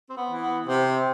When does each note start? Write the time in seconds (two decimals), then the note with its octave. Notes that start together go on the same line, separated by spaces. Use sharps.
0.09 C4
0.17 B3
0.29 E3
0.42 B3
0.68 C3